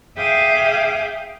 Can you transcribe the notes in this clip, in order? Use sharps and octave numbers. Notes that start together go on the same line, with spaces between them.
G#4 E5 F5 G5 D6 D#6